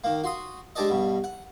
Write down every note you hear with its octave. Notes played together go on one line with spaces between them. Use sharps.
D#3 A#3
F#4 C6 D#6
G#3 D4 G4 A4 D5 D#5
G2 B2
F#5